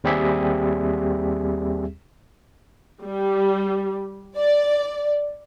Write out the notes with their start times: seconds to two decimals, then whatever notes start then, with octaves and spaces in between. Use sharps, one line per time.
0.04 D#2 G3 C4 G4 G#4 E5
3.03 G3
4.36 D5